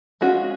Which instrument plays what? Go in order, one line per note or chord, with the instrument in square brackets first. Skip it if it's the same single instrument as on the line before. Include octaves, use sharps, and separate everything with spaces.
[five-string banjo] G#3 C#4 F4 F#4